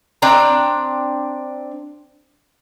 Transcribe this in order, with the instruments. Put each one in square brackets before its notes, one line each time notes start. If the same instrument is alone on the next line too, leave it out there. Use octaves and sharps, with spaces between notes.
[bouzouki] C4 D4 A#5